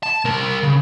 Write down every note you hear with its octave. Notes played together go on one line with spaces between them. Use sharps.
A5
C2 A#4
C#3